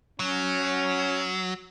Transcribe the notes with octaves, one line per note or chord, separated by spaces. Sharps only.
F#3 C#4